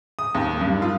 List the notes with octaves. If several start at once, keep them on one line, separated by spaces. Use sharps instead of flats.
D#6
D#2
G2
F4